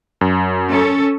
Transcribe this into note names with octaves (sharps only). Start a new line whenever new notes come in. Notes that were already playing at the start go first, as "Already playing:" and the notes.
F#2
C#4 A4